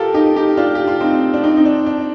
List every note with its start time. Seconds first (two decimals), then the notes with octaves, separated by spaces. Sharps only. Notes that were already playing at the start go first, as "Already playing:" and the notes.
Already playing: F4 G4 A4 A#4
0.14 D#4 G4
0.36 D#4 G4
0.57 D4 F4
0.75 G4
0.87 F4
1.00 C4 D#4
1.33 D4
1.43 C4 D#4
1.57 D#4
1.65 D4
1.86 D4